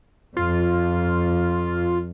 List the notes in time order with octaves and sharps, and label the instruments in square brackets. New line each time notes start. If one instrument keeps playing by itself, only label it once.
[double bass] F2 [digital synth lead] F4